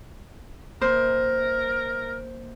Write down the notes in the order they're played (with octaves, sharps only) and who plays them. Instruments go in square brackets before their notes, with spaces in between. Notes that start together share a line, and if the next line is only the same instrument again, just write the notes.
[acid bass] D#1 [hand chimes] A#3 G6 [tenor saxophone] A#4 [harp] C5